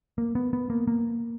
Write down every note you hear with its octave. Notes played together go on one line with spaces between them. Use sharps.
A#3
B3
B3
A#3
A#3